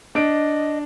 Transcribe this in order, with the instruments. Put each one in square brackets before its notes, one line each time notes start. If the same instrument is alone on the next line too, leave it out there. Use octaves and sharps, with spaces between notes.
[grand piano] D4 D7 [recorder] D#5